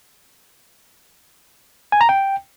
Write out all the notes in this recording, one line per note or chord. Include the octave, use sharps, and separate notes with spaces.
G#5
A#5
G5